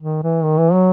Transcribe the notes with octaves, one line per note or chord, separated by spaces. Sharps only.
D#3
E3
D#3
E3
F#3